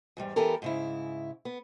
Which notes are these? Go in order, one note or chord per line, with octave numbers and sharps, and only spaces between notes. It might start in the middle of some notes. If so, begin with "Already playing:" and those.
E2 G#2 G3
E3 B3 G4 A4 A#4
G#2 C#3 E4
B3